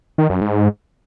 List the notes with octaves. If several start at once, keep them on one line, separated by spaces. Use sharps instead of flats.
D#3
F#2
G#2